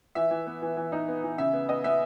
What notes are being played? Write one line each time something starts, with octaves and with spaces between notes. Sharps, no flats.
E3 E5
E3
B3
E3
E3
D#4
B3
E3
C#3 E5
B3
B3 D#5
B3 E5